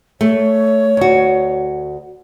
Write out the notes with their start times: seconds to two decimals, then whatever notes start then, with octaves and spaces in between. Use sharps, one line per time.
0.21 A3 C#5
0.97 D2 F#4